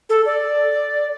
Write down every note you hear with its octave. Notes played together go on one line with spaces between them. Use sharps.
A4
D5